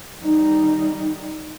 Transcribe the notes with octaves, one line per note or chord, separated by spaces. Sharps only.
G3 D#4